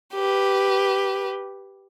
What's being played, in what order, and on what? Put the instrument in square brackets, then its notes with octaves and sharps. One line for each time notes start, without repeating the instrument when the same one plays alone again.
[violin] G4 B4